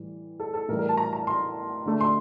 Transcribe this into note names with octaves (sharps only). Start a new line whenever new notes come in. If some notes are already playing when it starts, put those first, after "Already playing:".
Already playing: A2 E3 G3
A4
A4
A2 E3 G3 A#4
A#4
A5
A#5
A#5
C6
D3 A3
C6